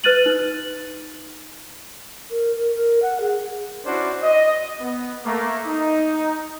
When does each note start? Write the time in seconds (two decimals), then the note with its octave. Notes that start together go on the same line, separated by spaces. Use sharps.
0.04 B4 F6 F#6 A6 D#7 F#7
0.26 D#4
2.30 A#4
2.55 A#4
2.74 A#4
3.02 F#5
3.20 G#4
3.85 C#4 D4 E4 F#4 C5 D5
4.23 D#5
4.81 B3
5.25 A3 A#3
5.67 D#4